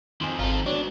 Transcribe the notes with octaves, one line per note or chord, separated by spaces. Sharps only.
F2 D#3 C4 G#5 C6
G#1 F4 A4 A#5
G#3 B3 D4 F#4 C#5